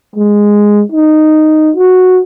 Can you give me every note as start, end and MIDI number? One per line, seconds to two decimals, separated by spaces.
0.16 0.83 56
0.92 1.72 63
1.77 2.20 66